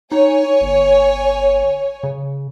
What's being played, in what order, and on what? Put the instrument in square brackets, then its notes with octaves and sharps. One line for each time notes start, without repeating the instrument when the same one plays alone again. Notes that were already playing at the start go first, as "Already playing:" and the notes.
[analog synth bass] D#4 [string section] C#5 G#5
[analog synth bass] G1
C#3